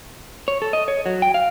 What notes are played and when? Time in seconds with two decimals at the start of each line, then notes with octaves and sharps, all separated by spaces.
0.48 C#5
0.62 A4
0.73 D#5
0.88 C#5
1.06 F#3
1.22 G5
1.34 F5